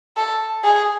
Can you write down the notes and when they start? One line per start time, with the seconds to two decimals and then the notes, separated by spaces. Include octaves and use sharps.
0.17 A4
0.64 G#4